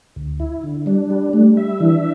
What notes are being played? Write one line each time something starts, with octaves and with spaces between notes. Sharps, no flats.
D2
E4
D3
G3 D4
G3
G3 A3
E5
E3 D4